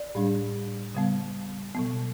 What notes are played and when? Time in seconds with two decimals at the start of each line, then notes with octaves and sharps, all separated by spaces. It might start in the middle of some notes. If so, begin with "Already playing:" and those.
Already playing: D5
0.15 A2 G3 D4
0.94 C#3 G3 B3
1.75 B2 F#3 B3